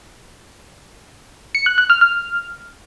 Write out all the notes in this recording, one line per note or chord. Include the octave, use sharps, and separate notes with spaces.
C#7
F#6
F#6
F6
F6